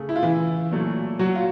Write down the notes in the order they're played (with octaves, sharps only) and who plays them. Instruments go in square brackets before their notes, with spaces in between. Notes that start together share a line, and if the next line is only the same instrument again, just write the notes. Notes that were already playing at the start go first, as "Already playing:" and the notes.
Already playing: [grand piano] C#3 A3
E4
F4
E3 E4
A#2 F#3 A3
F#3 F#4
F4